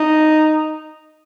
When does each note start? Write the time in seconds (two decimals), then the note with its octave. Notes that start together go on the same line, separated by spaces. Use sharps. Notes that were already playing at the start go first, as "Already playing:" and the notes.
Already playing: D#4